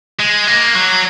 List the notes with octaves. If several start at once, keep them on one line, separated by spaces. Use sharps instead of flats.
G#3
A#3
F#3